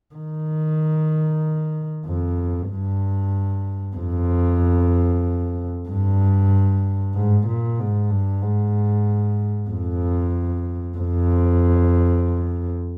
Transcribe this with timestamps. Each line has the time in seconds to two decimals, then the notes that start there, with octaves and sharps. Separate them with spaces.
0.15 D#3
2.06 F2
2.70 G2
3.97 F2
5.88 G2
7.15 G#2
7.47 A#2
7.79 G#2
8.10 G2
8.42 G#2
9.70 F2
10.97 F2